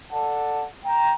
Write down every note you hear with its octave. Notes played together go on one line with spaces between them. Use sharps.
A4 D5 F#5 A5
G5 A#5